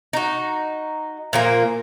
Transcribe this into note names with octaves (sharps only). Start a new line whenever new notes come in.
D#4 F#4
A#2 F3 A#3